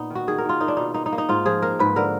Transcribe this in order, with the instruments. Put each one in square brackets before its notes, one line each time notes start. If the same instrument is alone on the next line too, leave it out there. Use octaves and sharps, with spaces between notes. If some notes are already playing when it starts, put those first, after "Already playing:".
Already playing: [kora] A#2 B3 D#4
D#3 F#4
D#3 G#4
A#4
D#3
F4
A#3 D#4
D4
B2 D#4
A#3 D#4
D#4
A#3
D#4
G#2 F4
F3 G#4
A#3 A#4
G#2 B4
D3 A#4